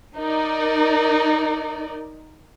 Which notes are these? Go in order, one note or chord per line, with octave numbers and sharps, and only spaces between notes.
D#4 A#4 D5